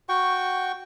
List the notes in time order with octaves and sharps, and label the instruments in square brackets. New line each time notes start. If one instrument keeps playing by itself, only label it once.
[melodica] F#4 G5 C#6